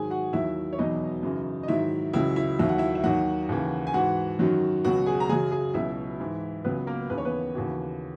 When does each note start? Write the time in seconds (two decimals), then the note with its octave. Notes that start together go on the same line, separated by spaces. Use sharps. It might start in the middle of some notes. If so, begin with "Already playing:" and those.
Already playing: G#2 D#3 F#3 G#4 G#5
0.10 F#4 F#5
0.33 D#2 D#3 F#3 E4 E5
0.73 C#5
0.78 E2 B2 F#3 D#4 D#5
1.23 F#2 C#3 E3
1.63 D#5
1.68 G#2 D#3 F#3 E4 E5
2.13 C#2 C#3 F#3 E4 E5
2.36 E4 E5
2.59 D#2 D#3 F#3 E5
2.69 F#5
2.78 E4 E5
2.95 E5
3.04 D#2 D#3 F#3 F#4 F#5
3.49 D#2 C#3 E3
3.87 G#5
3.94 G#2 E3 F#4 F#5
4.39 F#2 D#3 F#3
4.84 C#2 B2 F#3 F#4 F#5
5.06 G#4 G#5
5.20 A#5
5.29 F#2 C#3 F#3 G#4 G#5
5.51 G#4 G#5
5.74 C#2 B2 F#3 E4 E5
6.20 G#2 E3
6.64 C#2 C#3 F#3 B3 B4
6.87 A#3 A#4
7.10 D#2 C#3 E3 B4
7.18 C#5
7.25 B3 B4
7.55 D#2 C#3 E3 F#4